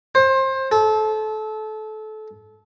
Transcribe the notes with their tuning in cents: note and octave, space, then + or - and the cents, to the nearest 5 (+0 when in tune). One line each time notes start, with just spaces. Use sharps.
C5 +25
A4 -25